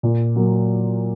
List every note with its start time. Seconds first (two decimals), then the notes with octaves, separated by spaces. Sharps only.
0.03 A#2
0.36 F#3 A#3